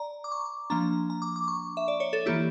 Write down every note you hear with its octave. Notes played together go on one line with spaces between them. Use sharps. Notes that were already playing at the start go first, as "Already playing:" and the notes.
Already playing: D5 A#5
D6
C#6
F3 A#3 D4 A#5
A#5
D6
D6
C#6
E5
D5
C#5
A4
E3 A#3 E4 G4